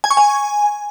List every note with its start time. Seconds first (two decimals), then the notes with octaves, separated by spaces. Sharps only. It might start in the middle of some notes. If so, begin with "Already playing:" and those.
0.04 G#5
0.11 C#6
0.17 G#5